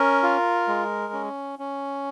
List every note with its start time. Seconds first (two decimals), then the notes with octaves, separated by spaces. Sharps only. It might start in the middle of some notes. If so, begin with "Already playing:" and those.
Already playing: C#4 A#4
0.23 F4
0.68 G#3
1.13 C#4
1.59 C#4